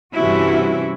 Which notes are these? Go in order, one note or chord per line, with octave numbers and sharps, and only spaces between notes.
G2 C3 E3 C#4 E4 F#4